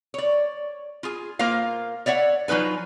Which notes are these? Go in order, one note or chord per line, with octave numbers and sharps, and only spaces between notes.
C#5 D5
F4 G#4
A#3 F4 A#4 C5 F5
C#5 D5 E5 F#5
F3 F#3 D#4 B4 G#5